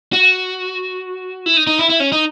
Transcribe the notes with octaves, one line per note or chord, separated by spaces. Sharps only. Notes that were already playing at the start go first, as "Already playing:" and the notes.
F#4
E4
D#4
D#4
E4
E4
C#4
D#4